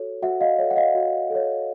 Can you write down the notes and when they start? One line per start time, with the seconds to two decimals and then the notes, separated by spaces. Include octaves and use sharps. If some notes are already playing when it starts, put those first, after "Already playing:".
Already playing: F#4 A4 C#5
0.22 F#4 E5 F#5
0.41 D#5 F5
0.58 A4 C#5 E5
0.71 F#5
0.76 D#5 F5
0.95 F#4
1.30 A4 C#5